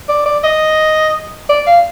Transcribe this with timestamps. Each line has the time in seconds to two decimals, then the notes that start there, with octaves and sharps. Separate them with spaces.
0.09 D5
0.26 D5
0.44 D#5
1.49 D5
1.66 F5